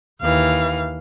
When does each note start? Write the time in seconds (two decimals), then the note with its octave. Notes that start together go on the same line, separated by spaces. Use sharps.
0.21 D#2 E3 F5